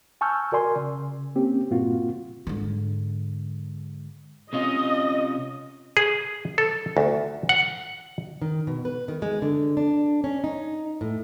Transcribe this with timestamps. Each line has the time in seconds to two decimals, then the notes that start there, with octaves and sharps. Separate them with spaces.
0.21 G#5 A5 C#6 E6 F6 G6
0.52 F#4 A#4 D5 G#5 C6
0.76 C#3
1.35 A#3 C4 C#4 G4
1.71 G2 A#2 A#3 C4 F4 F#4
2.47 G#2 D3
4.53 C3 C#4 F4 D#5
5.97 G#4
6.58 A4
6.97 D2
7.49 F#5
8.42 D#3
8.67 B2
8.85 B4
9.08 D#3
9.22 G#3
9.42 D3
9.77 D4
10.24 C#4
10.44 D#4
11.01 A2